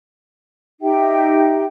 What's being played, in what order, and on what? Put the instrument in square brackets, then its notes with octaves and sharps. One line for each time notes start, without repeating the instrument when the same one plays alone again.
[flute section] D#4 G4 E5 G5